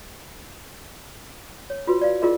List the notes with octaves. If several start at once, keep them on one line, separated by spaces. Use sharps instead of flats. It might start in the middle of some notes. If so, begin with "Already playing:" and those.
C#5
F4 F#4 B4
D5 F5
E4 F4 G#4 A#4 D#5